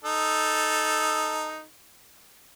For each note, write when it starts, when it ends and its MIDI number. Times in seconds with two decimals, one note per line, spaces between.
0.04 1.64 63
0.04 1.64 69